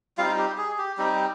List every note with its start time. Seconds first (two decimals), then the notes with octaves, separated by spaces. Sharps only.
0.18 G3 C4 D#4 F4 F5
0.38 G4
0.58 G#4
0.78 G4
0.98 G3 C4 D#4 G4